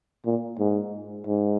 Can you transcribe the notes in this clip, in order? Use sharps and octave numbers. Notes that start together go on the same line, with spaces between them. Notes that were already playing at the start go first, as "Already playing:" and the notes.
A#2
G#2
G#2